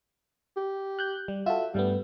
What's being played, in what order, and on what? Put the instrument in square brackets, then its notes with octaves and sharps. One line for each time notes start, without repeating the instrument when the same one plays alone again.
[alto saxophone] G4
[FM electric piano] F#6 G6
G3
[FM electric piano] F4 F#4 A4 [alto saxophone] E5
[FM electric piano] G2 A3 B3 [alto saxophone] G3